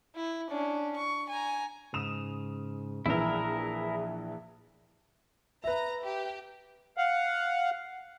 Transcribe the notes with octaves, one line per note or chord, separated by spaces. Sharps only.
E4
C#4 D4
C#6
G#5 A#5
G#2 C#3 D#6 E7 F7
A#1 E3 E4 G#4 A#4 E5 E6
B4 E5 A#5
G4
F5 F#5